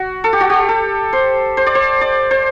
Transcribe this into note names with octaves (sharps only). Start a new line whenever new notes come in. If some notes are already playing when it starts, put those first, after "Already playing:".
Already playing: F#4
A4
G4
F#4
G4
A4
C5
C5
D5
C5
D5
C5